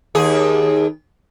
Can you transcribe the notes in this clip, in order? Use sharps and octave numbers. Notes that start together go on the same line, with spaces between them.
D#2 G#4